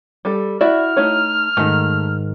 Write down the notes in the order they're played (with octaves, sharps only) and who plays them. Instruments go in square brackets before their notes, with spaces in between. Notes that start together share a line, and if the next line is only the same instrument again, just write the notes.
[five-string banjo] G3 A4
[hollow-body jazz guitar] E4 F#4 [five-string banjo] D5 E5 [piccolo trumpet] F6
[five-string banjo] A3 D#4 C#5
[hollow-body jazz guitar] G#2 D#3 [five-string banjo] A3